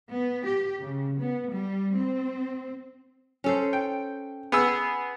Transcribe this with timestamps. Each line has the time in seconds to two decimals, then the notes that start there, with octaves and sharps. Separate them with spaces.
0.11 B3
0.46 G4
0.81 C#3
1.18 B3
1.51 G3
1.97 C4
3.44 C#4 A4 C5
3.73 G5
4.52 B3 G#4 E6